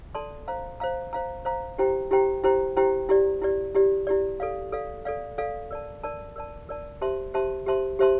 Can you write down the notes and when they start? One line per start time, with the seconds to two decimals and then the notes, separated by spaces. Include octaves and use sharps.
0.15 A4 D5 A5 C6
0.48 C5 F5 A#5
0.80 C5 F5 A#5
1.13 C5 F5 A#5
1.45 C5 F5 A#5
1.78 E4 G4 C5 G5 A#5
2.11 E4 G4 C5 G5 A#5
2.44 E4 G4 C5 G5 A#5
2.77 E4 G4 C5 G5 A#5
3.09 E4 G4 D5
3.42 E4 G4 D5
3.74 E4 G4 D5
4.07 E4 G4 D5
4.40 A4 D5 F5
4.72 A4 D5 F5
5.05 A4 D5 F5
5.38 A4 D5 F5
5.71 A#4 D5 A5
6.03 A#4 D5 A5
6.36 A#4 D5 A5
6.69 A#4 D5 A5
7.01 G4 C5 E5 A5 C6
7.34 G4 C5 E5 A5 C6
7.67 G4 C5 E5 A5 C6
7.99 G4 C5 E5 A5 C6